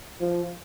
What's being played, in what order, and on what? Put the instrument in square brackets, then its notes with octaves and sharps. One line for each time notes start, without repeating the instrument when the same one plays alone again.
[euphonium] F3